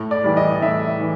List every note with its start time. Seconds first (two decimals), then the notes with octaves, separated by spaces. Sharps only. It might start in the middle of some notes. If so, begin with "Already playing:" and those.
Already playing: A2
0.11 D5
0.24 E3 G3
0.37 D#5
0.62 A2 E5
1.01 E3